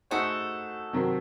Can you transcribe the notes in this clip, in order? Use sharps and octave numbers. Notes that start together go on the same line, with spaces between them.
A3 D#4 F#4 G#4 A4 C5
C3 D#3 F#3 C4